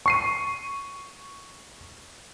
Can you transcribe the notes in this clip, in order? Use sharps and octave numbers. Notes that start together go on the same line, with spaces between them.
C#6 C7 D#7